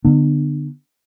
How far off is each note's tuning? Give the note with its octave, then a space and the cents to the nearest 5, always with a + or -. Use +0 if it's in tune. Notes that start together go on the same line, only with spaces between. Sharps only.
D3 +0 B3 +0 D4 +45